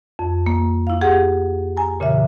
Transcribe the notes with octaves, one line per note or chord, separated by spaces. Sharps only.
F2
A#3
E4 F5
G4 G#4 F#5
G#5 A#5
A#2 C#3 E3 E5